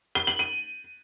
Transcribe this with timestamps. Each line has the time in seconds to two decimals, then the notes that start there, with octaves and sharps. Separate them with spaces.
0.15 G7
0.27 F#7
0.39 D#7